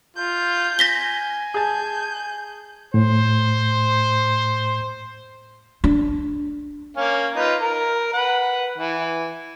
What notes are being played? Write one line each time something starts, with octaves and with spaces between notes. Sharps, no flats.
F4 G6
G#5 A#6 B6 G7
G#4 A5 G6
A2 C5
D4
A#3 C#4 F5
D#4 F4 B4
A#4
B4 F#5
E3